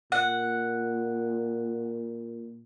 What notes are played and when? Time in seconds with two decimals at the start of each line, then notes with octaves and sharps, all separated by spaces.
0.12 A#2 F#5